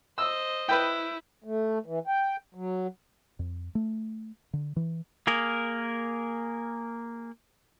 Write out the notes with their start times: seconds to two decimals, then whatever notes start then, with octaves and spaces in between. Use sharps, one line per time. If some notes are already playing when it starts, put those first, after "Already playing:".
0.18 C5 D#5 E6
0.69 E4 B4 G5
1.44 A3
1.86 E3
2.07 G5
2.55 F#3
3.39 F2
3.75 A3
4.53 D3
4.76 E3
5.27 A#3 G#4 A#4